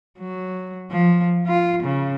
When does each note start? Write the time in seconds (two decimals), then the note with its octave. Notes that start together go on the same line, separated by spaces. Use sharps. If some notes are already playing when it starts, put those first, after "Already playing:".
0.19 F#3
0.90 F3
1.46 F4
1.82 C#3